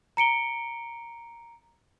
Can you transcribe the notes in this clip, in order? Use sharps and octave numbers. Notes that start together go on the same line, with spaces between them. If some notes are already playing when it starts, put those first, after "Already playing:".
A#5 C#7 D7 G7